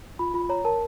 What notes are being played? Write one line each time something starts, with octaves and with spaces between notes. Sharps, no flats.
F4 B5
F4 B5
C#5 A#5
A#4 A5